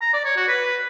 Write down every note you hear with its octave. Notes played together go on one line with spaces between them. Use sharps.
A#5
D5
C#5
F#4
B4